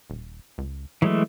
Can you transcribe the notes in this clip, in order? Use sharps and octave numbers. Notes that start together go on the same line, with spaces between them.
D#1
C#2
E3 F#3 G#3 A3